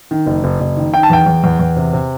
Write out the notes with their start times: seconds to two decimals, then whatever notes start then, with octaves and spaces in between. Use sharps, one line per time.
0.11 D#3
0.27 F#1
0.44 F#1
0.60 F#1
0.77 D#3
0.94 D#3 G5
1.03 A5
1.10 E2 G5
1.26 E2
1.44 E2
1.59 E2
1.77 C3
1.93 C3